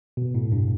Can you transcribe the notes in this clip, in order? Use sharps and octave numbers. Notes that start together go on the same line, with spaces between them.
B2
A2
G2